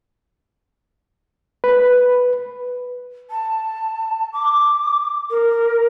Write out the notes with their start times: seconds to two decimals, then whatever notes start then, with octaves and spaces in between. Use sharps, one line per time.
1.64 B4
3.30 A5
4.33 D6
5.30 A#4